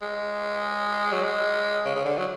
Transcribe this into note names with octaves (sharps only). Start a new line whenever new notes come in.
G#3
F#3
G#3
C#3
C#3
D3
F#3